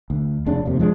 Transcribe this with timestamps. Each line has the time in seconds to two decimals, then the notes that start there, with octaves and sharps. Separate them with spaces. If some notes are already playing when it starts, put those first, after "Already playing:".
0.10 D2
0.46 F1 C#3 D4
0.65 F1 D#2 C3
0.79 F3 G#3 A3 D4